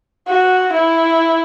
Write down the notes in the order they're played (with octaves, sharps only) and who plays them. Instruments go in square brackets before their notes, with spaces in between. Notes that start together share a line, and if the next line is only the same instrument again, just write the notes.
[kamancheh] F#4
E4